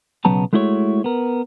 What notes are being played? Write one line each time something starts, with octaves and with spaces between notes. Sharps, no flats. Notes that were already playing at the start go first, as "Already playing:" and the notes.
B1 C#3 F#3 B3 A5 A#5
G#3 A3 E4 F#4 C5 C#5
B3 A#4